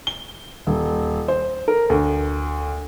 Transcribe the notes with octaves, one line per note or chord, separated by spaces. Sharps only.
G7
D#1
C5
A#4
D2